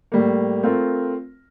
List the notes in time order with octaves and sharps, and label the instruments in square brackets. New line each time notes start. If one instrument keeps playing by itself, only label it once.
[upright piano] A2 G3 A#3
A3 C4 F4 A#4